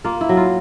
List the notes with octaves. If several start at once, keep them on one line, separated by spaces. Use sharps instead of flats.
A#3 F4
E4
F#3
F4